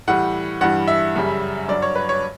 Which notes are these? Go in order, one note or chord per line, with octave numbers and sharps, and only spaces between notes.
A2 E3 G3 F#5
G2 E3 G3 F#5
E5
F#2 C#3 G3
G2 F#3 D5
C#5
B4
C#5